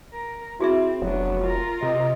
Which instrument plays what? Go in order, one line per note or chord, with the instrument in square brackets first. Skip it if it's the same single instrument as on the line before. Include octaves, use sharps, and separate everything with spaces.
[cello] A#4
[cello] C4 [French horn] E4 [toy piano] F#4 G#4 E5
[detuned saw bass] F1 [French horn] F#3 [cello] B3 D4
[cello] F4 A#4
[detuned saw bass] C3 [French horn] D#5